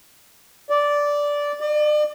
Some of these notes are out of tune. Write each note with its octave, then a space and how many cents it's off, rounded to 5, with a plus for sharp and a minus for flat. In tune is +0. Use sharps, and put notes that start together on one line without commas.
D5 -10
D5 +40